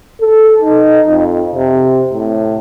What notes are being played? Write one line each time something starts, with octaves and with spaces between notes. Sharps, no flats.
A4
D#4
F2
C3
A2